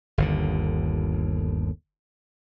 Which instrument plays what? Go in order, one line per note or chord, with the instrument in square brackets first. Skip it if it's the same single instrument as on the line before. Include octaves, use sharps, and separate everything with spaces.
[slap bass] G1 D#2 D3